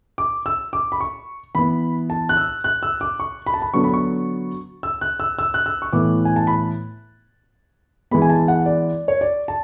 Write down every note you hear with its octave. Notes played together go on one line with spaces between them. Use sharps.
D6
E6
D6
B5
C#6
E3 B3 B5
A5
F#6
E6
F#6
E6
D6
C#6
B5
A5
B5
D3 F#3 B3 C#6
B5
C#6
E6
F#6
E6
E6
F#6
E6
C#6
A2 E3 B3 D6
G#5
A5
B5
E3 G#3 B3 B5
G#5
A5
F#5
D5
C#5
D5
A5